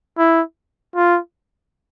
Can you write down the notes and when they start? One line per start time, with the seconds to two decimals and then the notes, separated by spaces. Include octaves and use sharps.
0.18 E4
0.96 F4